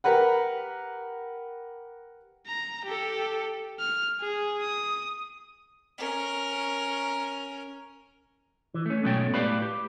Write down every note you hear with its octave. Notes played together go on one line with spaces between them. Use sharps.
G4 A#4 B4 F#5
A#5
G4 A4
F6
G#4
D#6
C#4 A#4
E3
A3 C#4
G#2 B2 F#3 A3 C#4 G5
A2 G4 B4 D5 F5 B5
G4